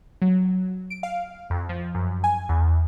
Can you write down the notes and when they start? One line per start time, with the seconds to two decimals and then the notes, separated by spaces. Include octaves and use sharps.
0.22 F#3
0.90 D7
1.03 F5
1.50 F2
1.69 F3
1.95 F#2
2.24 G#5
2.49 E2